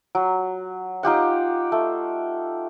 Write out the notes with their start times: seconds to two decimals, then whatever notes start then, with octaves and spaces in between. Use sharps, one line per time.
0.15 F#3
1.03 D#4 F4 G4 F#5
1.72 A3